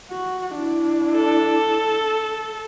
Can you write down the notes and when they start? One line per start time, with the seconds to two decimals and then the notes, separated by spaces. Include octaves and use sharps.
0.11 F#4
0.55 D4 E4
1.16 A4